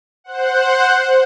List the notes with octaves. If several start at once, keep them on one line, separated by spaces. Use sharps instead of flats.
C5 F#5